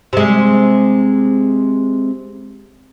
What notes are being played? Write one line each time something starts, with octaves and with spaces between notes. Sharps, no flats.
C3 G#3